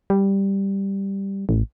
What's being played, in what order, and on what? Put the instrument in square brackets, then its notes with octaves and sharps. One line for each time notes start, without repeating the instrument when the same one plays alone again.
[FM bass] G3
A1